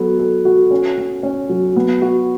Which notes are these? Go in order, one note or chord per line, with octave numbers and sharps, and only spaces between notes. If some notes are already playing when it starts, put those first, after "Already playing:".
Already playing: F#3 B3 A4
A4
F#4
C#4
C#4
C#4
F#3
B3
F#4